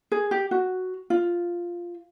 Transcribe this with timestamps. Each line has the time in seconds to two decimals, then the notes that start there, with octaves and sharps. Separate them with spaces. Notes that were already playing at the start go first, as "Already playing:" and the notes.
0.12 G#4
0.31 G4
0.51 F#4
1.10 F4